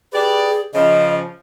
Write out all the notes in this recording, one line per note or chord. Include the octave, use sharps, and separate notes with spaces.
G4 G#4 B4 D5
C#3 F3 D#5